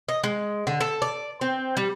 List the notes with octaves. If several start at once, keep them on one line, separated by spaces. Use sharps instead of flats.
D#5
G#3
D3
A4
D5
C4
G3